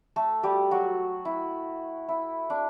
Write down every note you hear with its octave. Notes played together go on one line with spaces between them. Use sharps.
A3 A4
G3 G4
F#3 F#4
E4
E4
D4